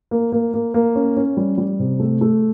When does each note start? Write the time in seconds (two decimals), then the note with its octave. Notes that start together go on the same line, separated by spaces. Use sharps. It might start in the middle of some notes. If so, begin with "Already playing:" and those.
0.11 A#3
0.32 A#3
0.54 A#3
0.74 A#3
0.95 C#4
1.17 C#4
1.37 G3
1.58 G3
1.79 C3
2.00 A3
2.21 A3